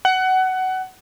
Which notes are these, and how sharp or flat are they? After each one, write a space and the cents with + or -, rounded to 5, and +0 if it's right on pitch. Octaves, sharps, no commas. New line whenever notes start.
F#5 +20